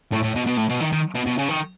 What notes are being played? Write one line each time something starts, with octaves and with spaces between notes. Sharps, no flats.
A2
A2
B2
B2
A2
B2
D#3
D#3
B2
B2
C#3
D#3